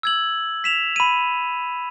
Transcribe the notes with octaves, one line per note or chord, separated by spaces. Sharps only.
E6 G#6 F#7
B6 E7 F7
B5 D#7